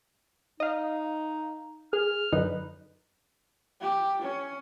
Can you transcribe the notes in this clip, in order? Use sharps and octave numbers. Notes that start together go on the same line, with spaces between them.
D#4 D#5 F5
G#4 F6
F#2 D3 D#4 B4
G4
C#4